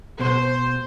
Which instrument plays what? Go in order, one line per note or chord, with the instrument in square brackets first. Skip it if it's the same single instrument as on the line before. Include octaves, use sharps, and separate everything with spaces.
[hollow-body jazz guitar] B2 [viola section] C5